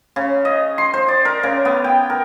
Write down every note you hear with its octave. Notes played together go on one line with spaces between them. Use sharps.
C#3
D#5
C6
C5
D5
A#4
C#3
B3
G5
A#4